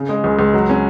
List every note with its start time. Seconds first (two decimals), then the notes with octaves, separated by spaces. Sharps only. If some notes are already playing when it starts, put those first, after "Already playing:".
Already playing: C#3
0.09 G#3
0.24 C#2
0.39 C#2
0.54 F#3
0.69 C#4